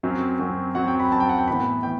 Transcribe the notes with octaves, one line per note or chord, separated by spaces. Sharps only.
F#2 F#3 C4
F#2 F#3 C4
F#2 F#3 C4 F#5
G5
B5
F#2 F#3 C4 A5
G5
F#5
G5
A2 E3 B3 B5
A2 E3 G5